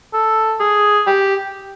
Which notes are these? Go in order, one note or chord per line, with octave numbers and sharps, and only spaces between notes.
A4
G#4
G4